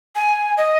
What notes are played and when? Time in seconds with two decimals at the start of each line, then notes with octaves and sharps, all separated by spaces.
0.16 G#5
0.57 D#5